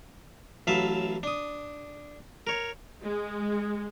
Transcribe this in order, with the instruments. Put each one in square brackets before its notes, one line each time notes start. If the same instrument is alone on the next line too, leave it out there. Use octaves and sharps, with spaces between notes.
[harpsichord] A1 F#3 B4 E5 F5 A5
D4 D#6
A#4 C#5
[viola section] G#3